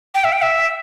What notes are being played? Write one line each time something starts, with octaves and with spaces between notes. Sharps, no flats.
G5
E5
G5
E5